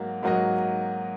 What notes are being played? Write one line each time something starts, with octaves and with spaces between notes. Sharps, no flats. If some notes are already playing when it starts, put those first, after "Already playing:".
Already playing: G#2 F#3 A#3 F#4
G#2 F#3 A#3 F#4 D#5